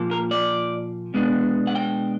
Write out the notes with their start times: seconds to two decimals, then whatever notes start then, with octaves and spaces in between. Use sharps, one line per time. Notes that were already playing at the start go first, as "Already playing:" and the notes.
Already playing: A#2 F3 A#3
0.11 A#4
0.31 D5
1.14 B2 G#3 B3 D4
1.67 F#5
1.75 G5